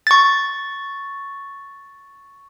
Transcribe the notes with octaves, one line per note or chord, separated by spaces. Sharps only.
C#6 A6